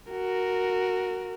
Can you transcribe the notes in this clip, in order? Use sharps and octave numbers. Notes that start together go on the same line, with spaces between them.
F#4 A#4